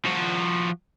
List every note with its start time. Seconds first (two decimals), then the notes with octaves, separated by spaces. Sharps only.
0.06 F3 F#4